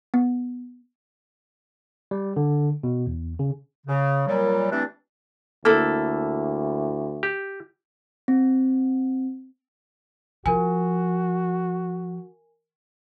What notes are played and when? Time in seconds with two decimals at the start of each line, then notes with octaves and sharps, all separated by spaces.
0.14 B3
2.11 G3
2.36 D3
2.83 B2
3.07 E2
3.39 C#3
3.86 C#3
4.27 A#2 F#3 G3
4.71 E3 G3 A3 C4 D4
5.65 D2 A#3 E4 A4
7.23 G4
8.28 C4
10.46 F3 F#4 A#4 G#5